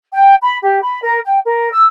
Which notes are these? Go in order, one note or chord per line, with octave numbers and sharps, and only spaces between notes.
G5
B5
G4
B5
A#4
G5
A#4
E6